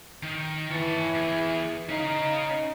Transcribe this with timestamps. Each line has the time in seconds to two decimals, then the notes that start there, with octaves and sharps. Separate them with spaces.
0.23 D#3
0.72 E3 C#5 A5
1.15 E2 G#4
1.89 C#4 D#4 F5